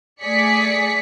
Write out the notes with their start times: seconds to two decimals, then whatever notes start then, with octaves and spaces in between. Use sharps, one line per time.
0.23 A3 G#4 D5 B6 C#7